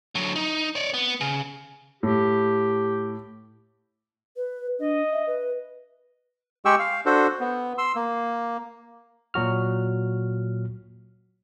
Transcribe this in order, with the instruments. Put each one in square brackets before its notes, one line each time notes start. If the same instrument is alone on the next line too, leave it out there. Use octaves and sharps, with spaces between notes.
[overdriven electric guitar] D3 F#3
D#4
C#5 D5
B3
C#3
[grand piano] A2 [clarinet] G4
[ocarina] B4
[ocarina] D4 [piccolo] D#5
[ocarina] E5
B4
[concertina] G#3 G4 G#4 G5 C#6 E6
F5
D4 F#4 A4 C5
B3
C6 E6
A#3
[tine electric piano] A#2 F#3 F#4 F6